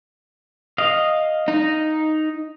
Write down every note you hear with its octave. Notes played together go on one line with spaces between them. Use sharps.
D#5 F5
D#4